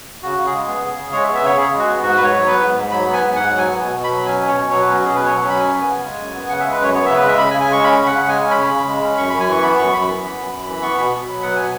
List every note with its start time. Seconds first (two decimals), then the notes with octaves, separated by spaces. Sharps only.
0.23 C#3 F#4
0.38 C#3
0.46 G#4
0.53 G#3
0.67 B3
0.83 C#3
0.97 C#3
1.12 G#3 C#5
1.23 E5
1.28 B3
1.34 E5
1.42 C#3 C#5
1.57 C#3 G#4
1.73 G#3
1.79 F#4
1.87 B3
2.02 G#2 F#4
2.17 G#2 B4
2.24 C#5
2.32 F#3
2.46 B3 B4
2.61 G#2
2.76 G#2
2.91 F#3 B5
3.06 B3
3.13 G#5
3.22 G#2
3.36 G#2 F#5
3.51 F#3
3.58 G#5
3.66 B3
3.82 B2
3.96 B2
4.04 B5
4.11 F#3
4.26 C#4 G#5
4.40 B2
4.48 C#5
4.55 B2
4.70 F#3 C#5
4.81 C#4 B4
4.93 F#4
5.00 B2 G#4
5.15 B2 B4
5.26 F#3 C#5
5.38 F#5
5.44 C#4 B5
5.60 F#2 G#5
5.76 B3
5.83 G#5
5.89 C#3
6.05 G#3
6.20 F#2
6.34 B3
6.49 C#3 F#5
6.60 G#3 E5
6.71 B4
6.80 F#2 C#5
6.94 B3 C#5
7.06 C#3 E5
7.16 B4
7.24 G#3 E5
7.38 C#3 B5
7.51 G#5
7.54 C#3
7.61 G#5
7.69 G#3 C#6
7.83 C#4 B5
7.98 C#3
8.06 F#5
8.14 C#3
8.28 G#3 G#5
8.44 C#4
8.51 B5
8.58 C#3
8.74 C#3
8.88 G#3
9.03 C#4
9.17 F#2 C#6
9.29 F#2 B5
9.40 G#5
9.48 E3 C#6
9.63 B3 B5
9.78 F#2 C#6
9.92 F#2 B5
10.08 E3
10.22 B3
10.38 F#2
10.52 F#2
10.67 E3
10.82 B3 C#6
10.98 B2 B5
11.11 B2
11.27 F#3
11.42 B3 F#5
11.56 B2 G#5